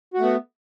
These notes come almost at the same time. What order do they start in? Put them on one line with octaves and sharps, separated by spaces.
F#4 A3 B3